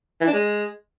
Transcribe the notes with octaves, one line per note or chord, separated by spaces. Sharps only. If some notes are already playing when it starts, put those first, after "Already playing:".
E3
D4
G#3